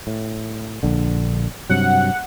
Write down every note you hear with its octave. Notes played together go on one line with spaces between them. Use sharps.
A2
A#1 D3
G2 C3 F#3 F#5